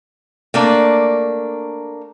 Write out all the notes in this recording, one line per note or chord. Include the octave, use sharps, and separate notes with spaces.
A3 A#3 D4